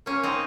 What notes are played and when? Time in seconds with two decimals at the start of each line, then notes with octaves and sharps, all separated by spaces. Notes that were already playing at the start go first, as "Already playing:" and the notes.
0.06 A#3 C#4
0.23 C4 D#4